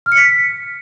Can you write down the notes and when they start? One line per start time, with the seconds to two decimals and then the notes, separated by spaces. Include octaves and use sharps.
0.06 F6
0.12 C#7
0.17 B6